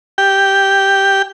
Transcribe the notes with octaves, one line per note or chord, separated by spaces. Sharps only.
G4 G5